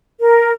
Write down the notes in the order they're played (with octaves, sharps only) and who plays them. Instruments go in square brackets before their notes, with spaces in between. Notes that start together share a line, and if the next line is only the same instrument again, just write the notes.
[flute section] A#4